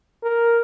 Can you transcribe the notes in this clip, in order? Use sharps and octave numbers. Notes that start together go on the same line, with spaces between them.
A#4